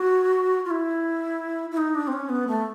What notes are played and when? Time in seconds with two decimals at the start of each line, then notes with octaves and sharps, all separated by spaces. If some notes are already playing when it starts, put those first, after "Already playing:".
Already playing: F#4
0.65 F4
0.70 E4
1.71 E4
1.77 D#4
1.95 D4
2.07 C4
2.12 C#4
2.29 B3
2.48 A3